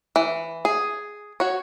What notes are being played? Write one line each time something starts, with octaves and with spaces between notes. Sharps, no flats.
E3
G#4
F#4 C#5